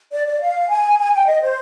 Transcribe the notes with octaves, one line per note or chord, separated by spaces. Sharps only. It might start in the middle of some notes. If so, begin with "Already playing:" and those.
D5
D5
F5
G#5
G#5
G5
D#5
C5